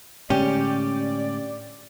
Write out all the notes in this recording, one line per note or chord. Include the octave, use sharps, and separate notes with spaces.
A2 D3 G#3 C#4 G4 D5